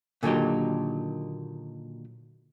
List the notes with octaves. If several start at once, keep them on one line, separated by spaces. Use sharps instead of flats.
A#2 D3 D#3 F#3 D#4 G4